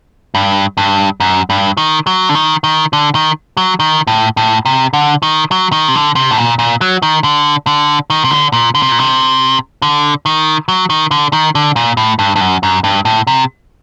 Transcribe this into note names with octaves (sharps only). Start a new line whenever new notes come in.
G2
G2
F#2
G2
D#3
F#3
D3
D#3
D#3
D3
D#3
F#3
D#3
A2
A2
C3
D3
D#3
F#3
D#3
C3
D3
C3
A2
A#2
A#2
F#3
D#3
D3
D3
D#3
C3
D3
A#2
D3
C3
A#2
C3
D3
D#3
F#3
D#3
D3
D#3
D3
A#2
A2
G2
G2
F#2
F#2
G2
A2
C3